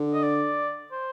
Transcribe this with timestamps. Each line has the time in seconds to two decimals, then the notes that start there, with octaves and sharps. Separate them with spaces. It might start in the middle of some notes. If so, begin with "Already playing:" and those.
Already playing: D3
0.14 D#5
0.24 D5
0.92 C5